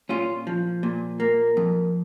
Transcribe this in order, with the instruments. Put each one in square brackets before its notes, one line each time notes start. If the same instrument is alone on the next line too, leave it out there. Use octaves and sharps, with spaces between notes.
[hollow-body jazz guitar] A#2 C#4 F4
F3
A#2
A#3
F2